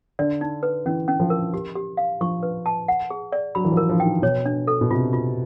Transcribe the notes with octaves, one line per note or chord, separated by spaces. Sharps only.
D3 D5
D#4
B4
E3 C#4
C#4
F3
A#4
G4
G4
F5
F3 C#6
B4
A5
F#5
G#4
D5
F#3 B5
E3
F3
A#4
F3
G5
D#3
B2 C#5
D4
A4
B2
C3 F4
F4